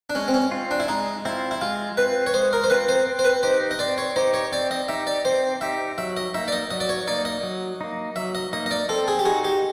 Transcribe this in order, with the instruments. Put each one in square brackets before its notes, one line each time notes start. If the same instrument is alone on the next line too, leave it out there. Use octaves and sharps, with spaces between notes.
[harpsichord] D4
[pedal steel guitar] G#3 [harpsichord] C#4
[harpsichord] C4
C#4
[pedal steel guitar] C4 F4
[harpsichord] D4
E4
[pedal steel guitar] G#3 [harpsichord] D#4
[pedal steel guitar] C4 F4 [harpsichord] E4
[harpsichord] E4
[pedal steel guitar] G#3 [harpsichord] F4
[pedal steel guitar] C4 F4 [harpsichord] B4
[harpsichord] C#5
[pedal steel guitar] G#3 [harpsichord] C5
[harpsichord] A#4
C5
[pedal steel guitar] C4 F4 [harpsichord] B4
[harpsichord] C5
[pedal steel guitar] C4
[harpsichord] C5
B4
[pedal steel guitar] D#4 G4 [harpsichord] C5
[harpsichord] D#5
[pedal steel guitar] C4 [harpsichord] D5
[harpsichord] C#5
[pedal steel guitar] D#4 G4 [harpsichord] C5
[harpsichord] C#5
[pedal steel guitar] C4 [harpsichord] D5
[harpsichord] D#5
[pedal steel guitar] D#4 G4 [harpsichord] E5
[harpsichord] D5
[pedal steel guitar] C4 [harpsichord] C5
[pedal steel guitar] D#4 G4 [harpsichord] E5
[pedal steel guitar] F#3 [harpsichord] E5
[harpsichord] D#5
[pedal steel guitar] A#3 D#4 [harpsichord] E5
[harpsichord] D5
D#5
[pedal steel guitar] F#3 [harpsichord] D#5
[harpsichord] D5
C#5
[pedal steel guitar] A#3 D#4 [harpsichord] D5
[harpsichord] D#5
[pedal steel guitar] F#3
A#3 D#4
[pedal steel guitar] F#3 [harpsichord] E5
[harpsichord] D#5
[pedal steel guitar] A#3 D#4 [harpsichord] D#5
[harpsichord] D#5
D5
[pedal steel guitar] C4 [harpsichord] A4
[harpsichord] G#4
G4
[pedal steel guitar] D#4 F#4 [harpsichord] G#4
[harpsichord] G4